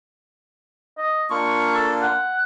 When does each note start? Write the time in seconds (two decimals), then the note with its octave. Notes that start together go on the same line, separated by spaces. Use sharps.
0.98 D#5
1.30 A#3 D4 F4 C#6
1.75 A4
2.02 F#5